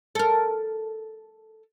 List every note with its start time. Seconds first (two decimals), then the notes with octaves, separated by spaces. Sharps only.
0.15 A4 A#4